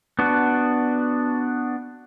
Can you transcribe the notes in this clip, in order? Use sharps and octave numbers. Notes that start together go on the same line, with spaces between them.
B3 D4 F#4